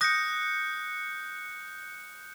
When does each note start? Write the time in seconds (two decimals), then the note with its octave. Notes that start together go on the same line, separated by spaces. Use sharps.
0.01 D#6 F#6 G6 A#6 C#7